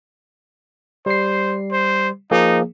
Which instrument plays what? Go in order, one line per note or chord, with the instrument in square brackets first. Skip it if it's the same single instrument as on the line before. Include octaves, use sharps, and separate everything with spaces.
[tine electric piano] G3 C7 [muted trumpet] C5
[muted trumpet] C5
[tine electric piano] F3 A#3 G#4 [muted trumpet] D#4